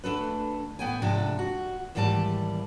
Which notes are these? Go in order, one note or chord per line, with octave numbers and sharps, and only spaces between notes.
D2 D4 A4 B4
A2 B3 G5 G#5
G#2 C3 F3 D4 A4
F#4
D#2 G#2 E3 G3 G#4 A5